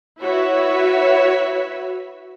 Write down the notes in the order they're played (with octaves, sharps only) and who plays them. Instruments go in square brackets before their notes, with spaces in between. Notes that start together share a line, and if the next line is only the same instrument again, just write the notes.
[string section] E4 F#4 B4 C#5 E5